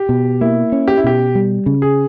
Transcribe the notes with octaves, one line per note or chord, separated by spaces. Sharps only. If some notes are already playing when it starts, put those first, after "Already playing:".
Already playing: G4
B2
A#3 E4
C#4
G4
E4
B2 G4
G3
C#3
G#4